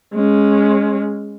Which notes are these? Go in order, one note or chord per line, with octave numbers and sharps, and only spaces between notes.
G#3 C#4